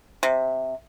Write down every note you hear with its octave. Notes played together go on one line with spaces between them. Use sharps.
C3